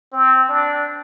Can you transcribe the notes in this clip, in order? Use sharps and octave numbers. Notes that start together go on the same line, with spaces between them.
C4
D4